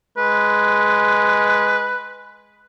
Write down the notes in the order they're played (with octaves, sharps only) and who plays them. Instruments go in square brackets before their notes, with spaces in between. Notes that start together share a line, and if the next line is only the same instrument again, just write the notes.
[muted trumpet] G#3 [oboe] B4